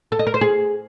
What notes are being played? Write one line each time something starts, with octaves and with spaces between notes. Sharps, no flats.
A4
D#5
A#4
C5
G#4